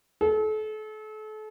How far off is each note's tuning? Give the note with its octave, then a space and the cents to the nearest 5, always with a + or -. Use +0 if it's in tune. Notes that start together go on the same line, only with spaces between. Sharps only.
A4 -35